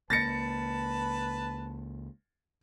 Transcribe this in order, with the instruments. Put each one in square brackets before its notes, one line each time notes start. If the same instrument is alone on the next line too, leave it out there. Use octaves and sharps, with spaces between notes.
[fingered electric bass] C#2 A#3 [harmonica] B4 A5 [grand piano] A6 A#6 C#7